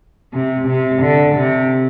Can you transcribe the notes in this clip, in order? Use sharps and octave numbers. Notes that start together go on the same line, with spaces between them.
C3
C3
D3
C3